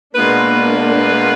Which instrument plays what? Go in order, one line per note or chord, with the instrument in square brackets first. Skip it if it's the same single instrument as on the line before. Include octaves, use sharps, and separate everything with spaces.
[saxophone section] B2 G#3 B3 F4 B4 [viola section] A#3 D4